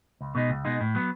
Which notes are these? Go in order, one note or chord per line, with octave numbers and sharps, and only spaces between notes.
C#2
B2 G#3 D#4
C#2
B2 G#3 D#4
A2
F#3 B3